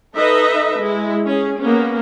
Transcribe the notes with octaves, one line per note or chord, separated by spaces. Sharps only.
D#4 A4 B4 D#5 E5
G#3 E4
C#4 G#4
A#3 B3 C#4